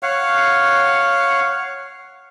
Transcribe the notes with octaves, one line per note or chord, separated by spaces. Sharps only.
C#5 F5 F#5